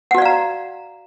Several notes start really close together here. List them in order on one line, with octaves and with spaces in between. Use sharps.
F#5 F#4 D5 F5 A#5